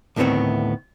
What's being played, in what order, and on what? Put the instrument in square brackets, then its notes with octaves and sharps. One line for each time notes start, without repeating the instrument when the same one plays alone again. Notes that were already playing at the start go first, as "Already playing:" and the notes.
[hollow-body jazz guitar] D2 A2 D#3 B3 C4 C#5